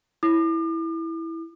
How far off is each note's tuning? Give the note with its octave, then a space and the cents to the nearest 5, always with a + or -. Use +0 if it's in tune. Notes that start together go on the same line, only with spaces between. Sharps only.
E4 -5 D6 +40